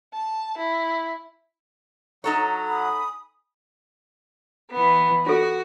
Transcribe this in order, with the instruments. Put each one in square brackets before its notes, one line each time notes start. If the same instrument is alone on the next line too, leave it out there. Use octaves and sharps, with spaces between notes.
[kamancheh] A5
E4
[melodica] F#3 F#5 [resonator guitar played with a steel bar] D#4 A4 C#5 [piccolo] A#5
[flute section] G#5 B5 D#6
[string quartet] E3 B3
[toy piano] F4 A4 [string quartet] F#4